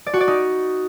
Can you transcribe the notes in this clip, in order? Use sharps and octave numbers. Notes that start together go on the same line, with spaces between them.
D5
F#4
D5
D#4